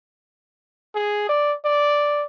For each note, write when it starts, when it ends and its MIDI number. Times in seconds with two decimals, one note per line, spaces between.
0.95 1.26 68
1.29 1.53 74
1.65 2.25 74